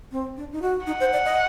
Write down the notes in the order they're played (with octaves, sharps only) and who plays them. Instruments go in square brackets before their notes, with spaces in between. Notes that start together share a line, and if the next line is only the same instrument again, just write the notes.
[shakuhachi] C4
D4
D#4
F#4
[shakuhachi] D#4 [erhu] F#5
[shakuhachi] C5
D5
D#5